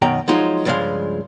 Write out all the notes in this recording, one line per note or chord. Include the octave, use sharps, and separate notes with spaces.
F#2 B2 D#3 G5 A#5
F3 F#3 G#3 D#4 F4
C#2 G2 F3 G#3 G#4 F5